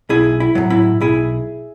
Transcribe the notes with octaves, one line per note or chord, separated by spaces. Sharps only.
B1 E4 G#4
E4
A2 F#3
E4
B1 E4 G#4